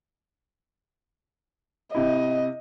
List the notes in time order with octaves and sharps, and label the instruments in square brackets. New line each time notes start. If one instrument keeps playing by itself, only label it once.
[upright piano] C3 E4 [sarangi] D#5